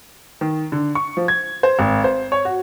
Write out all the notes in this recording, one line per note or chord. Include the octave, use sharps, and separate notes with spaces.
D#3
D3
C#6
F3
G#6
C5
G#1
C5
C#5
F#4